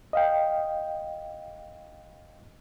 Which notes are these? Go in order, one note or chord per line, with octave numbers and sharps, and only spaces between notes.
D#5 F5 G5